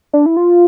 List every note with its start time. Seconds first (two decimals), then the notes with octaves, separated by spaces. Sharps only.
0.13 D4
0.26 E4
0.37 F4